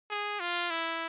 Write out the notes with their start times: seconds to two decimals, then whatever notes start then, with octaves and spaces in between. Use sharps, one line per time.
0.10 G#4
0.40 F4
0.70 E4